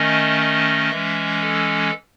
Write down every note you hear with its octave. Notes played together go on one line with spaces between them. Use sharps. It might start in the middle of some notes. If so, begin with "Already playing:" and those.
Already playing: D#3 A3 C#4 D#5
D#5
E3 G#3 C#4 E5
A4